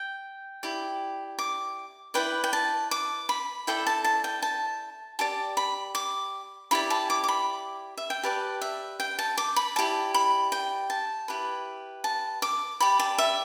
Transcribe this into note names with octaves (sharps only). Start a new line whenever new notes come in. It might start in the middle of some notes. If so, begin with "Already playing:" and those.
Already playing: G5
E4 G4 D5
D6
E4 B4 D5 G5
G5
A5
D6
B5
E4 A4 D5 G5
A5
A5
G5
A5
G4 D5 A5
B5
D6
E4 G4 D5 B5
A5
D6
D6
B5
E5
G5
G4 B4 D5 A5
E5
G5
A5
D6
B5
E4 G4 D5 A5
B5
G5
A5
E4 G4 B4
A5
D6
G4 D5 B5
A5
E5